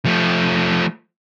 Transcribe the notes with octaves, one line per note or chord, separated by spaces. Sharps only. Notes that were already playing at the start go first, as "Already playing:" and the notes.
F3 A3